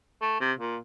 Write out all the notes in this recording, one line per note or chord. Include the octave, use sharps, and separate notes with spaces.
A3
C3
A#2